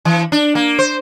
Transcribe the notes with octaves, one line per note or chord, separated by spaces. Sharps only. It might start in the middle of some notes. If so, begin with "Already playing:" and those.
E3
D4
A#3
C5